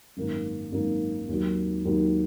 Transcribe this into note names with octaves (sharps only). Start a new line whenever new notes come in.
G#1 F#2 D#3 A#3 D#4
G#1 F#2 D#3 A#3 D#4
D#2 D#3 F#3
D#2 D#3 F#3